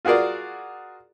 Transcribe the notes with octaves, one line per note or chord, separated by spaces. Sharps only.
F4 F#4 G#4 A#4 D5